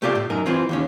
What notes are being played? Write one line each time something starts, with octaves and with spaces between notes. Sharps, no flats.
A3 F4 G4 D5 F5
A2
F#2 D#4 A#4
E3 C4 F4 C5
D#2 D#3 C#4